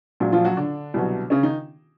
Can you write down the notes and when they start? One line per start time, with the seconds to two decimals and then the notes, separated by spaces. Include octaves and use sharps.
0.20 A#1 A#2 F#3
0.32 F3 F4
0.45 F#3 F#4
0.57 D3 D4
0.94 C2 B2 F#3
1.30 C#3 C#4
1.43 D#3 D#4